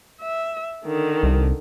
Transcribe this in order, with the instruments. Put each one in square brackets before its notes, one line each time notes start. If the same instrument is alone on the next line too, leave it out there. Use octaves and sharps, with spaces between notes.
[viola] E5
D3 D#3
[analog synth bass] C2